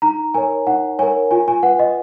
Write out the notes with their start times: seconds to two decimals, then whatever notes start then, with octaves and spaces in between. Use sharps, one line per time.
0.02 D#4 A#5
0.34 A#4 C#5 G#5
0.67 D#4 F#5
0.99 A#4 C#5 G#5
1.31 F4 G#5
1.48 G#5
1.63 B4 F#5
1.79 D#5